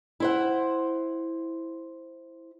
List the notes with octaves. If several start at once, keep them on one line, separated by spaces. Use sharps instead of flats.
E4 C5 F#5